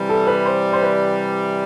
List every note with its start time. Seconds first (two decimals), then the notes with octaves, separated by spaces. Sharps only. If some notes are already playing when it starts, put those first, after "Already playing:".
Already playing: C3 E3 G3
0.09 A4
0.27 B4
0.45 C5
0.73 C5
0.82 B4